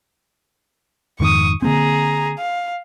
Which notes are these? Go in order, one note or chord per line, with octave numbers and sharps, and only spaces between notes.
F2 G#2 D#3 C#6 D#6
D3 A#3 C4 G#4 A#5
F5